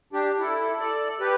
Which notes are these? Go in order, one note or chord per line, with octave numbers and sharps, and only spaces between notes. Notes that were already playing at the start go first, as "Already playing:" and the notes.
D4 G4
E4 A4
A4 D5
G4 B4